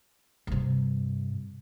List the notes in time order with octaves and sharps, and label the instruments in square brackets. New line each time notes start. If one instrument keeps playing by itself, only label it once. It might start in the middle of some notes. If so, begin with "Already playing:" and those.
[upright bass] G2 C3